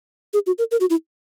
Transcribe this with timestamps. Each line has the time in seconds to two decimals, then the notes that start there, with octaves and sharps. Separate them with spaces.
0.34 G#4
0.46 F#4
0.58 A#4
0.71 A#4
0.80 F#4
0.90 E4